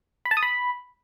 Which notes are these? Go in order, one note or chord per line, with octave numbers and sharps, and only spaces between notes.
B5
A5
D#6
B5